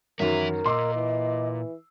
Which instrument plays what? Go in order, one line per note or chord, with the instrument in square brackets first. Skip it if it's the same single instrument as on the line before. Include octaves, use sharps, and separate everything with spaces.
[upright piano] F#2 D#3 F#3 [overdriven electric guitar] E3 E5 [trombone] A#4
[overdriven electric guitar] A#2 [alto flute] D#5 [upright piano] C6 D6 E6
[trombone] E3